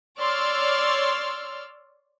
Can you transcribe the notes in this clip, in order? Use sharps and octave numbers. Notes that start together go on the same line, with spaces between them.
C#5 D5 C6 E6 F6